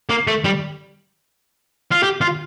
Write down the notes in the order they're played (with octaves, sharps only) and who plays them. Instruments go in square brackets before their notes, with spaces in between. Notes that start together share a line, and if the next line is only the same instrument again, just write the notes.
[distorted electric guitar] A#3
A3
G3
F4
G4
F4